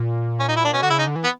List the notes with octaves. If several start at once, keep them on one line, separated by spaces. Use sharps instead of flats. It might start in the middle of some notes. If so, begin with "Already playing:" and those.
Already playing: A#2
C#4
D#4
E4
D4
B2 C#4
D3 F#4
C#3 E4
D#4
D3
E3
B3